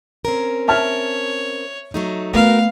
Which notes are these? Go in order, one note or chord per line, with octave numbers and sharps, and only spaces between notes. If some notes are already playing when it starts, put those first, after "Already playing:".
C4 C#4 A#4
C#5 E5 A5 F6
F#3 A3 D#4
A3 B3 F#4 A#4 F5